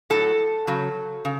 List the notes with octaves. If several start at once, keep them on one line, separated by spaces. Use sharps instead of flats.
A2 F#3 A4
C#3 F#3
C#3